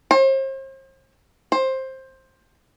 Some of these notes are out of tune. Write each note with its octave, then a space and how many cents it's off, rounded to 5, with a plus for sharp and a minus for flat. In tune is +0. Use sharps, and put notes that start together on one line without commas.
C5 +40
C5 +15